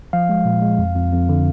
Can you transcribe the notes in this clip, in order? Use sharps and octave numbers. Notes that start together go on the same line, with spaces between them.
F3 F5
G#3
A#2
G#3
F2
F2
F2
D3